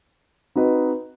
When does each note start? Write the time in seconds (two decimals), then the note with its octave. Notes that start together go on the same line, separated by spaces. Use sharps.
0.55 C4 D#4 F#4 B4 D#5